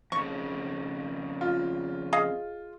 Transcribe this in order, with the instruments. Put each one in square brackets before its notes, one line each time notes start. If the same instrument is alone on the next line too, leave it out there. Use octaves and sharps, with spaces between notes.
[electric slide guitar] F2 C#3 [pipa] C#6
[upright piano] F4
[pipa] G#4 D#5 F5